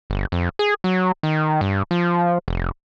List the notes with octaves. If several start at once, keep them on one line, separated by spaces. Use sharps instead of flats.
G1
F2
G#4
F#3
D#3
G2
F3
F1